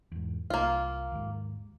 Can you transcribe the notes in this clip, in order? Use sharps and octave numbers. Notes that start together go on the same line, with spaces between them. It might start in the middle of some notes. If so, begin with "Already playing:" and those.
E2 G#2
C2 A#3 F4
D#2 G#2